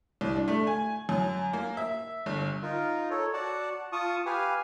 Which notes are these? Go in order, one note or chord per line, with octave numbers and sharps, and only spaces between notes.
C2
D4
A3
G#5
F#2
A#3
E5
G1
D#4 F4 A#4
A4 C#5
F#4 D5 F#5 A5
F4 A5 C#6 D#6
G4 B4 F5 G#5